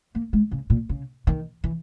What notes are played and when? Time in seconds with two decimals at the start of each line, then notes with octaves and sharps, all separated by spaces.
0.15 A#3
0.33 G#3
0.51 C#3
0.70 A#2
0.89 C#3
1.27 D#3
1.64 E3